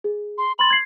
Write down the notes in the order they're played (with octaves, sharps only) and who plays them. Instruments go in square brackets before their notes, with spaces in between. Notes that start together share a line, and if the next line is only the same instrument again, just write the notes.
[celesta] G#4
[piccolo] C6
[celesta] B5 C6 A6 [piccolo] F#7
[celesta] G#6 C7